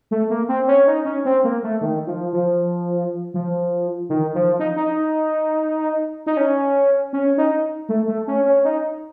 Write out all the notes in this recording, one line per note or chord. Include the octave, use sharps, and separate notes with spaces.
A3
A#3
C4
C#4
D#4
C#4
C4
A#3
A3
D#3
F3
F3
F3
D#3
F3
D#4
D#4
D#4
C#4
C#4
D#4
A3
A3
C#4
C#4
D#4